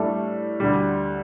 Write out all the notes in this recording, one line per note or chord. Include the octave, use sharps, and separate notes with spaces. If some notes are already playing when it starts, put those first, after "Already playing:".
Already playing: A2 G3 A3 D4
D2 D3 G3